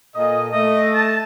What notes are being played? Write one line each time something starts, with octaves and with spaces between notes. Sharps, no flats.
A#2 A4 D#5
A3 D#5
A5